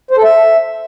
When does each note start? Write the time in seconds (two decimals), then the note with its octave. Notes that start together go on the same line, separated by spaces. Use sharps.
0.11 C5
0.17 A4
0.24 E5